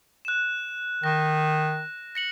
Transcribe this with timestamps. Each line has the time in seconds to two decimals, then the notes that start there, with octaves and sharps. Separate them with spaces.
0.25 F#6 E7
1.04 D#3 A#6
2.15 A#6 C#7 F#7